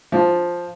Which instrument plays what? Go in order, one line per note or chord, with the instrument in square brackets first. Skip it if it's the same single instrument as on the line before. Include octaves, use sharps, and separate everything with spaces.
[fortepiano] F3